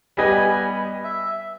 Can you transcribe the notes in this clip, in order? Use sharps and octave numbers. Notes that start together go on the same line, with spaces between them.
G3 B3 G4 B4 D#5 G#5
E5